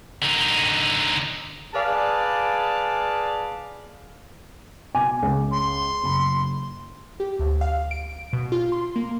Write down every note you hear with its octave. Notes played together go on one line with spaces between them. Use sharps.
D3 D#4
G#4 B4 D5 F5 A5
B2 G#5 D6
C#2
C6
F#1 B5
G4
D2
F5
D7
B2
F4
C6
A#3